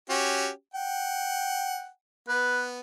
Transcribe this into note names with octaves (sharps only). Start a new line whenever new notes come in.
C#4 F#4 G4
F#5 G5
B3 B4